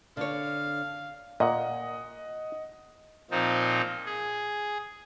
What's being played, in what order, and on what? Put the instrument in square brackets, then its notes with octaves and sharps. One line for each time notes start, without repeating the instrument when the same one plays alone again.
[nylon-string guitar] D3 C#5 [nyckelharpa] F5
[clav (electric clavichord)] A#2 [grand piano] D#5 F#5
[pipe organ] A#2 F3 C4 D#4
G#4